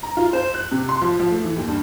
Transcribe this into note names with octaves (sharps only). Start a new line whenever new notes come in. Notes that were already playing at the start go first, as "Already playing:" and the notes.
A#5
F4
C5
F#6
C3
C6
F3
F3
A3
E3
D#2
G2